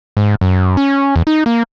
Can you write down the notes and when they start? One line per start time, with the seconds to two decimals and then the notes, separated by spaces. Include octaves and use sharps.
0.17 G#2
0.41 F#2
0.77 C#4
1.16 E2
1.27 D#4
1.46 A#3